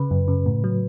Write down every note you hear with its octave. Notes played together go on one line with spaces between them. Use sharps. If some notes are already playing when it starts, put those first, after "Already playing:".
Already playing: C#3 B4
F#2
C#3
A2
F#3